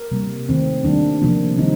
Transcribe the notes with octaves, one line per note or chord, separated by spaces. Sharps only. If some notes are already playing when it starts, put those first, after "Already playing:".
Already playing: A#4
C3 G3 A#3
C3 D#3 A3 C4
D#3 G3 A#3 D4
C3 F3 A#3
D#3 G3 C4 D#4